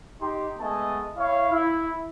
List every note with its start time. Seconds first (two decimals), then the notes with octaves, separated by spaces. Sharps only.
0.21 D#4 G4 C6
0.59 G#3 A3 B3 D#5 G#5 A5
1.16 E4 C#5 F5
1.51 E4